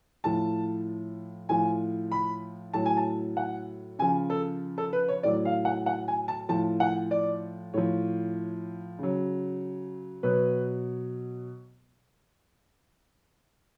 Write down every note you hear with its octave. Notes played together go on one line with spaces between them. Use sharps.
A2 F3 A5
A2 F3 G#5
B5
A2 F#3 A5
G#5
A5
F#5
C#3 F3 G#5
A4
A4
B4
C#5
A2 F#3 D5
F5
F#5
F#5
G#5
A5
A2 F3 A5
F#5
D5
A2 F3 C#5
C#3 F#3
B2 F#3 B4